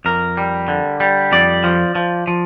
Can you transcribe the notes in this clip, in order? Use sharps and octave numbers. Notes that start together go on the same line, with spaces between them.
F2 A#4
G3
D3
G3
F2 D5
F3
F3
F3